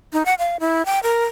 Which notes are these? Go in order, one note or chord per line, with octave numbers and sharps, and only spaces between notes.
D#4
F#5
F5
E4
G5
A#4